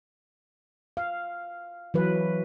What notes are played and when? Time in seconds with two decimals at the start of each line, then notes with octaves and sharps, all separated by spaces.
0.97 F5
1.94 E3 F#3 B4